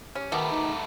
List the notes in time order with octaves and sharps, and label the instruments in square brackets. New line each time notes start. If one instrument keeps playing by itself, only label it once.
[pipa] C#4 [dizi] G4
[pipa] B2 [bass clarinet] D#3 [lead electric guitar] A3 B3 [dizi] D6
[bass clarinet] D#4